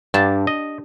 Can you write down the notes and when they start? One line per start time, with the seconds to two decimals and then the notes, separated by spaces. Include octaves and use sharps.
0.14 G2 D4 G4 A5
0.47 D#5